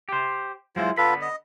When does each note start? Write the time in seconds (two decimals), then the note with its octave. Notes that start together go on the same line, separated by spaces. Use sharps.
0.09 G4 C5
0.76 F#3 G#3 E4 F4 C5
0.97 D3 B3 F4 A4 B4 B5
1.21 D#5